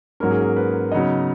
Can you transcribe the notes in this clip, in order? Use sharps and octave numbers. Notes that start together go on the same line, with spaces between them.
G#2 F#3 A#3 C#4 A#4
G#4
A#4
B4
C#3 F#3 B3 D#4 D#5